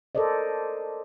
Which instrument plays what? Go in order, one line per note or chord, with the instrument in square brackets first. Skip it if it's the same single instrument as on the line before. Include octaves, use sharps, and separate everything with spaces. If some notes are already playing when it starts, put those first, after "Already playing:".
[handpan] A4 A#4 C5 D5 D#5